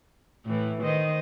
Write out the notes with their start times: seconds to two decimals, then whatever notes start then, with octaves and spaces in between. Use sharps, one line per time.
0.46 A2 E3
0.83 D#3 C5 D#5